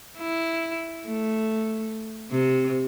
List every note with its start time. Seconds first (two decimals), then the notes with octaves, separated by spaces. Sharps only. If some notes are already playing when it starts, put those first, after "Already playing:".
0.18 E4
1.06 A3
2.31 C3